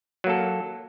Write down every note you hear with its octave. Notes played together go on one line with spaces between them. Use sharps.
F#3 A#3 A4